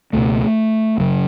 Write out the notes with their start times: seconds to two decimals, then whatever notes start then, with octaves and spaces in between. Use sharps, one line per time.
0.13 C#2 B2 A3
0.98 F#1 F#2 C#3